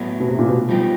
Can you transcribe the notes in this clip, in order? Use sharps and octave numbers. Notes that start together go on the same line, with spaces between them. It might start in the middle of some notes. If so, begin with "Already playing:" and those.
Already playing: A2 F#3 B3 E4
B2
C3
A#2
B2
F3 G3 B3 D#4 G4